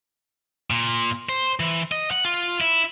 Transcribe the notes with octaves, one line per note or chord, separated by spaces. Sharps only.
A#2
C5
E3
D#5
F#5
F4
E4